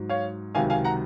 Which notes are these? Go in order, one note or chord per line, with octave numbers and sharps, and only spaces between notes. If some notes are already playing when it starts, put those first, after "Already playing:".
Already playing: G#2 F#3
C#5 F5
C#2 C3 D#3 F#3 F5 G#5
F5 G#5
F#5 A#5